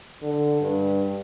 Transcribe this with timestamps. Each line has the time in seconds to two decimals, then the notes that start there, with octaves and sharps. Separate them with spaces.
0.22 D3
0.61 G2